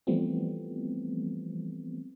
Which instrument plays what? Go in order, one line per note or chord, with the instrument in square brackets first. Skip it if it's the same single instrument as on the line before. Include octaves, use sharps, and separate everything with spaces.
[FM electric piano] E3 F3 G3 A3 B3 C4